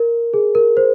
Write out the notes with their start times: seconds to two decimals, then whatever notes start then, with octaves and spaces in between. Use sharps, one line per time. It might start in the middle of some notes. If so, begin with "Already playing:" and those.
Already playing: A#4
0.34 G#4
0.55 A#4
0.77 C5